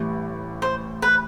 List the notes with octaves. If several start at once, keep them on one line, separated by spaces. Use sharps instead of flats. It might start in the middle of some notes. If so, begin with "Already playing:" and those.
Already playing: A1 A2 E3 G3
C5
B4